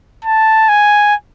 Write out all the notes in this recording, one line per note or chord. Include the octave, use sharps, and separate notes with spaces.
A5
G#5